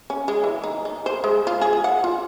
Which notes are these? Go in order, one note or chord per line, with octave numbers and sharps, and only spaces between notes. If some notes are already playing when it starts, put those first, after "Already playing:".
C#4
G#3
E3
D#4
D#4
C5
G#3
F4
G#4
F3
F#5
F4